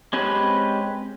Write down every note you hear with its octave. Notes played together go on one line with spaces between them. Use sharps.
G#3 C4 C#4 G4 B4